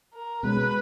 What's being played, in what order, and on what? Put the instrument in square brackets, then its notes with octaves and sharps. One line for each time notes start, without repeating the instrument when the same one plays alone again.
[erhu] A#4
[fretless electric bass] B2 G#3 C#4 [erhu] B4